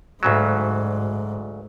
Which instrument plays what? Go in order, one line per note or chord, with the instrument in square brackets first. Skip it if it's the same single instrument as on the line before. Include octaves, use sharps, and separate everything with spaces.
[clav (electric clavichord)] D2 C#3 F#3 [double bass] G#2